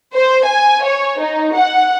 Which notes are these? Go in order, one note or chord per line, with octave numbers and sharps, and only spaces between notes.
C5
G#5
C#5
D#4
F#5